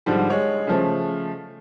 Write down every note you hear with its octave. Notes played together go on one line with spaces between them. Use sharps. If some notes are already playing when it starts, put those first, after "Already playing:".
G#2 D3 F3 G3
G#3 C#5
C#3 F3 A3